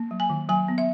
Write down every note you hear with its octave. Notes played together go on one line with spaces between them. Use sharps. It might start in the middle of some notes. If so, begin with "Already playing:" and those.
Already playing: A#3
F#3
G#5
D#3
F#3 G#5
B3
E5